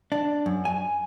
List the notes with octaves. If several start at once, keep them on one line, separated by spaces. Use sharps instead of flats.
D4
F#2
G#5